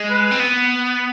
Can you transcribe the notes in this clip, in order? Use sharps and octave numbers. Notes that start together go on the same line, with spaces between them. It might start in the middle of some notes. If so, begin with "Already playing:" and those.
Already playing: G#3
B4
C4
B3